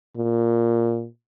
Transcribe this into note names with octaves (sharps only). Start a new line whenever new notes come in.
A#2